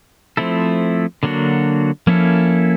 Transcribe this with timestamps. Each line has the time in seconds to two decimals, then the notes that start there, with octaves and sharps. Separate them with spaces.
0.37 F3 A3 C4 E4 A4
1.23 D3 F#3 A#3 D4 F#4
2.07 F3 A#3 C#4 E4 A4